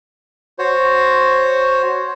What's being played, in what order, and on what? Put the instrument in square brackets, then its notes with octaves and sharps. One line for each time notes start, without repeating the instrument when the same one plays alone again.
[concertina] F#4 C5 C#5